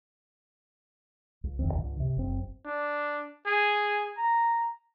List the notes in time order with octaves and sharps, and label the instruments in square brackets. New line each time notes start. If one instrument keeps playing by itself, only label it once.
[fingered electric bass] C#2
E1 F2 D#3 C4
C#2 G2 D3
C3
F#1 C4
[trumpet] D4
G#4
A#5